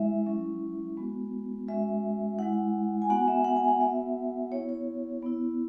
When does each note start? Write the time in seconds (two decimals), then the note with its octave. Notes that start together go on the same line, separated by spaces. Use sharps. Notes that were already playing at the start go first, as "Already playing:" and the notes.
Already playing: G#3 E4 E5
0.26 F#3 C#4 E4
0.97 G#3 B3 F#4
1.68 G#3 C#4 F#4 E5
2.39 G#3 E4 F#5
3.02 G#5
3.10 B3 F#4 F#5
3.28 E5
3.44 F#5
3.57 G#5
3.68 F#5
3.80 B3 F#4 E5
4.51 B3 E4 C#5
4.69 C#5
5.22 B3 E4